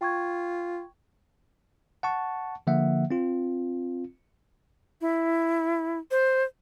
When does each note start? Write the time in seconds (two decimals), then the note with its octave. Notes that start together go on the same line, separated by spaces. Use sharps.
0.01 F4 G5 C#6 G#6
2.03 F#5 A5 C#6
2.67 D3 F3 A#3 E5 F#5
3.11 C4 F4
5.01 E4
6.11 C5